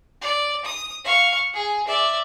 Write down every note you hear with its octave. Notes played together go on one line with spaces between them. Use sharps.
D5
D#6
F5 C#6
G#4
D5 E5